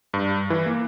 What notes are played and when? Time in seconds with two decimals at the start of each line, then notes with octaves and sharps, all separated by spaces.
0.14 G2
0.50 E3
0.66 A#3